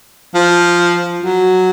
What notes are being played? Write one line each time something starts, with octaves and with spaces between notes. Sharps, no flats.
F3
F#3